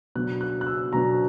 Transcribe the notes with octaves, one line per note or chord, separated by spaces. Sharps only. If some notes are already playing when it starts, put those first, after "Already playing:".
B2 F#3 B3 D4 F#6
F#6
F#6
E6
B2 F#3 B3 D4 A#5